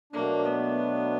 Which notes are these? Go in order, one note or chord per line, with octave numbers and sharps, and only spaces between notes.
B2 F#3 A3 A#3 D4
B3